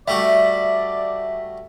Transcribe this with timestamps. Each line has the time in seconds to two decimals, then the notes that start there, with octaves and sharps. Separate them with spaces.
0.08 G3 A3 F#4 D5 E5